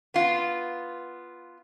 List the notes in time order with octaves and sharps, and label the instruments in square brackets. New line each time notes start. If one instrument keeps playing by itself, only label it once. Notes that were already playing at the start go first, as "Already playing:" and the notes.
[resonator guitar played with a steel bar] B3 F4